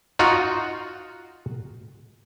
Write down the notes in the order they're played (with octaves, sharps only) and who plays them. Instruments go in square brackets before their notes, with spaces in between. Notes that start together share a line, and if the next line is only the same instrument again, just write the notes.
[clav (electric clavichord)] D#4 F4 F#4